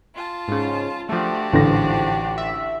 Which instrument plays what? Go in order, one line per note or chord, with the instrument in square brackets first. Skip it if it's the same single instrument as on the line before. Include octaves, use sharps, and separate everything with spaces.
[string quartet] F4 A5
[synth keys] G#2 C#3
[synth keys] F3 A3 [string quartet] D4 F#4 G4
[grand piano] A1 D3 A#6 [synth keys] G#2 F3
[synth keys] E5